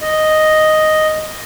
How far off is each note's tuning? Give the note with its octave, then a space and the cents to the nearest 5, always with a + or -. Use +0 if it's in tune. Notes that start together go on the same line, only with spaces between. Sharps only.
D#5 +0